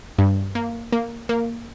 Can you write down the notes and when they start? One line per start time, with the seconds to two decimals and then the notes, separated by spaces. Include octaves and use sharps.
0.19 G2
0.55 A#3
0.93 A#3
1.29 A#3